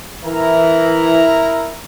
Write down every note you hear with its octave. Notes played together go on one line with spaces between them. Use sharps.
E3 E4 A#4 A#5